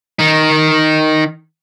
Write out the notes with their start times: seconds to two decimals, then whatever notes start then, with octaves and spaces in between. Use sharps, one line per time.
0.19 D#3 D#4